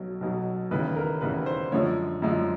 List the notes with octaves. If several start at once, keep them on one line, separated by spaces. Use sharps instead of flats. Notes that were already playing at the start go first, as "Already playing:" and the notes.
Already playing: B1 B2 F#3
B1 B2 F#3
E1 D#2 C#3 E3 B4
A#4
E1 D#2 C#3 E3 B4
C5
F#2 D3 F3 G#3 C#5
F#2 D3 F3 G#3